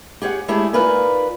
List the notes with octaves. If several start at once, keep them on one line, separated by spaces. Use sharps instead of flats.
G4 G#4 C#5 E5 F#5
G#3 A3 D4 E4 G4 G#4
D#4 F4 A#4 B4 D5 G#5